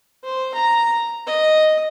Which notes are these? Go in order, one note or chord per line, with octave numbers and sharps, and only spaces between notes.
C5
A#5
D#5